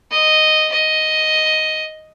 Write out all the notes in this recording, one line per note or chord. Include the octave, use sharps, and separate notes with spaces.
D#5
D#5